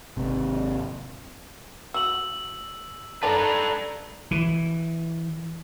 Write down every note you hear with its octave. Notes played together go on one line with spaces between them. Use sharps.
G#1 C3
F#4 E6 F#7
D4 D#4 A4 B4 D5 A5 A#5
E3